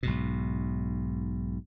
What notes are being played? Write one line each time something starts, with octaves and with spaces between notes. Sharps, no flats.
B1 G#2 B2